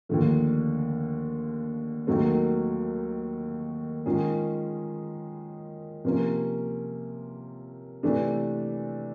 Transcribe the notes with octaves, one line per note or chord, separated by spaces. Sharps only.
D#2 D3 F3 A3
D#2 D#3 F#3 A3 C4
D#3 G#3 C#4 F4 G#4
C3 F3 A#3 C#4
C3 E3 A3 D4